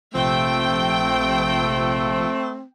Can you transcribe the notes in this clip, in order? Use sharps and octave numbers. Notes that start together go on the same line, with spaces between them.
A#1 C3 F3 A3 C4 G5